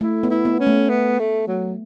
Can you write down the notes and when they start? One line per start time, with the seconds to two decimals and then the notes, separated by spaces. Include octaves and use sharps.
0.01 A3 E4
0.23 B3
0.30 E4
0.45 B3
0.60 C#4
0.67 A3
0.89 B3
1.19 A3
1.47 F#3